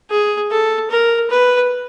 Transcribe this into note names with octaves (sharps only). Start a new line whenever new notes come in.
G#4
A4
A#4
B4